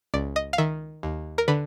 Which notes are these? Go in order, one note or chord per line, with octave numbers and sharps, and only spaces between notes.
C#2 D5
D#5
F5
D#3 E5
D#2
A#4
D3 B4